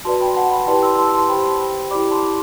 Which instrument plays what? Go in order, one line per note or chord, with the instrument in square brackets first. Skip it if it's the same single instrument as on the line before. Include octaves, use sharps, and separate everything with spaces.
[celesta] F#4 B4 D5 A5 C6
G5 B5
F#5 A5
G5 B5
E4 G4 B4 D5 A5 C6
C6 E6
A5 C6
A5 C6
G4 C5 G5 B5
E4 G4 D5 B5 D6
A5 C6